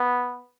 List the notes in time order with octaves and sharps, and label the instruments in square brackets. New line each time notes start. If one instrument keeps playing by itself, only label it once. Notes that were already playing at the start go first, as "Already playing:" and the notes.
Already playing: [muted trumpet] B3